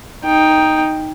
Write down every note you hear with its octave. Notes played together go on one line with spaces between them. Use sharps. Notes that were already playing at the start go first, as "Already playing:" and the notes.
D#4 G5